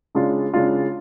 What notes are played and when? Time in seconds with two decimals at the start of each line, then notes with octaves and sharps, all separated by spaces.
0.15 C#3 G#3 D4 F4
0.54 C#3 G#3 D4 F4